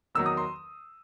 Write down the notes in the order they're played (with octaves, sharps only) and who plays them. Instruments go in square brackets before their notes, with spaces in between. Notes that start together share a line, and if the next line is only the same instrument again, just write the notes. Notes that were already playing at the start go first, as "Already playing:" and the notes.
[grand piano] E2 D#3 F#3 E6
D#6
C6